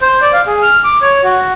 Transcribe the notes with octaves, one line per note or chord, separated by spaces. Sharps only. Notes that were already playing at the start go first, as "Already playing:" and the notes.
C5
D5
F5
G#4
F6
D6
C#5
F#4